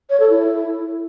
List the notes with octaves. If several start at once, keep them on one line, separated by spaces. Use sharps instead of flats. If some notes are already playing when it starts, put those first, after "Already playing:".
C#5
A4
E4